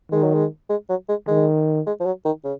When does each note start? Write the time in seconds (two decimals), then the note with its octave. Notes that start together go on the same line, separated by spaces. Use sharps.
0.12 D#3 G#3
0.23 F#3
0.34 G#3
0.70 G#3
0.89 F#3
1.09 G#3
1.28 D#3 G#3
1.87 G#3
2.00 F3
2.06 F#3
2.25 D#3
2.44 C#3